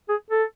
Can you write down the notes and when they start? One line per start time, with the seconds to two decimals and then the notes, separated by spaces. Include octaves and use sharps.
0.09 G#4
0.30 A4